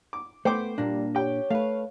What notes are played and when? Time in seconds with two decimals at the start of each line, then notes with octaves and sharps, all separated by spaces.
0.13 D6
0.45 A3 B3 C5 G5 D6
0.78 A#2 G3 A#3 D4
1.15 G4 C#5 G5
1.50 A3 B4 F5